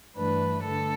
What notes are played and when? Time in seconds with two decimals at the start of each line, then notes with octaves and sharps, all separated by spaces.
0.16 G2 E3 A3 D4 B4
0.63 D3 A3 A4